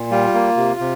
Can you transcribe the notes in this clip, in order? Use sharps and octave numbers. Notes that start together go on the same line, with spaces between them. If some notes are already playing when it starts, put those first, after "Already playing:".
Already playing: A#2
G3 F4
A#3
C3
C3